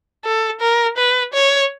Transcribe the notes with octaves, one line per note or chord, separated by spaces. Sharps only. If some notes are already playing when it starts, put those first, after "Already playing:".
A4
A#4
B4
C#5